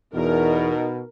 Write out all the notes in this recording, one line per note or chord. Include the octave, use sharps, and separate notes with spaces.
E2 B2 D#4 A#4